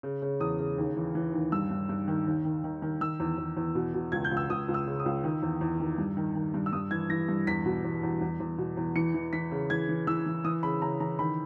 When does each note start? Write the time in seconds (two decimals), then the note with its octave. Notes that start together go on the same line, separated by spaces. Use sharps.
0.03 C#3
0.22 C#3
0.40 E2 D#6
0.59 C#3
0.78 D#2
0.96 E3
1.15 E3
1.34 D#2
1.52 G2 E6
1.71 G2
1.89 G2
2.08 D#3
2.27 D#2
2.45 D#3
2.64 D#3
2.82 D#3
3.01 D#3 E6
3.20 E2
3.38 E2
3.57 E2
3.75 B2
3.94 B2
4.12 C#2 G#6
4.24 G6
4.31 C#2
4.37 E6
4.50 C#2 D#6
4.68 C#2
4.74 E6
4.87 C#3
5.00 D#6
5.06 C#2
5.24 D#3
5.43 E2
5.61 E2
5.80 D#3
5.98 G2
6.17 D#3
6.35 D#3
6.54 G2
6.66 E6
6.73 G2 D#6
6.91 E3 G#6
7.10 E3 A#6
7.28 G2
7.47 E2 B6
7.66 B2
7.84 E2
8.03 E2
8.21 E2
8.40 E2
8.58 B2
8.77 E2
8.96 E3 C#7
9.14 E3
9.33 E3 B6
9.52 C#3
9.70 E3 G#6
9.89 E3
10.07 E3 E6
10.26 E3
10.44 E3 D#6
10.63 C#3 B5
10.82 C#3 A#5
11.00 E3 A#5
11.19 D#3 B5